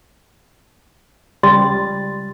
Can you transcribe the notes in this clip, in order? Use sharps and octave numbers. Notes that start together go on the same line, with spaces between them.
C#2 G3 C6 A6